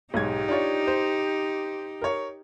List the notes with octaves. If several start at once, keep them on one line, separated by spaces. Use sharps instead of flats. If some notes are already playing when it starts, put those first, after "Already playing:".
B1 G#2 D#4 G4 G#6
D4 F4 C#5
C5
A#4 C#5